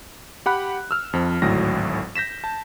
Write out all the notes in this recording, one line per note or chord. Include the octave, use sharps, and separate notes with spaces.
G4 F#5 B5 F#6
E6 F6
F2 F3
G#1 D2 A2 F#3 A#6
G6 A#6 B6 E7
A5